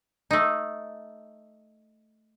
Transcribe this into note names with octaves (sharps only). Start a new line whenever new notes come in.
A3 D#4